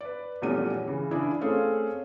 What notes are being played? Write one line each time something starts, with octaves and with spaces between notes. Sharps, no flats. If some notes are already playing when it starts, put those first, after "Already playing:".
B4 D5
A#1 E2 G3 A3 C#4 D#7
C#3 E3
C#3 D4 E4 G#4
A3 C4 C#4 G#4 A4 F5